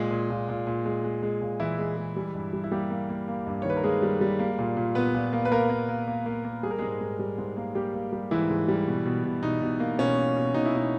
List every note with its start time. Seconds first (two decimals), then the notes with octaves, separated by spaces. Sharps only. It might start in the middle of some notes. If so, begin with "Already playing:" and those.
Already playing: A#2 G#3 G#4
0.10 A#2
0.30 A#2
0.49 A#2
0.67 A#2
0.85 G#3
1.04 G#3
1.23 G#3
1.41 A#2
1.60 A#2 E3 E4
1.78 G#3
1.97 G#3
2.16 G3
2.35 G2
2.53 G3
2.64 E4
2.72 G3 A#3 G4
2.90 A#3
3.10 A#3
3.28 A#3
3.47 G2
3.62 C#5
3.65 D#3 B4
3.77 A#4
3.84 G#3 A#3 G#4
4.02 G3
4.21 G3
4.39 A#3
4.58 A#2
4.77 A#2
4.95 A#2 B3 B4
5.14 A#2
5.33 A#3
5.45 B4
5.52 A#3 A#4
5.70 A#3
5.89 A#3
6.08 A#3
6.26 A#3
6.45 A#3
6.63 G3 G#4
6.71 A#4
6.78 G#2 G#3 G#4
7.01 G#2
7.19 G3
7.38 G#2
7.57 A#3
7.75 G3 A#3 G4
7.94 A#3
8.13 G3
8.31 G#2 E3 E4
8.49 G#2
8.68 G3
8.87 B2
9.05 B2
9.25 B2
9.43 B2 D#4
9.62 B2
9.80 A#3
9.99 B2 C#4
10.17 A#3
10.36 B2
10.54 B2 D#4
10.65 E4
10.73 B2 D#4